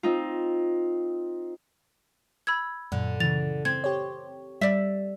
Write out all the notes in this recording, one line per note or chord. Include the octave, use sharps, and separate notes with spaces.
C4 D#4 F4
B5 E6 G#6
F#2 A#2 D3
C#3 E3 A6 F7
C4 G#6
G4 C#5
G3 D5 E5 B6